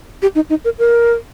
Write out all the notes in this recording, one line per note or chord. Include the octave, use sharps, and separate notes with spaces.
G4
D#4
D#4
A#4
A#4